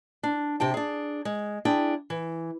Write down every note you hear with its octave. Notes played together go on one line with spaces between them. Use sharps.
D4
C3 G4 G5 A5
D4 G#4
G#3
D4 E4 G#4 G5
E3